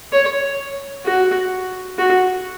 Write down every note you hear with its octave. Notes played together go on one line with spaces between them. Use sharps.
C#5
F#4
F#4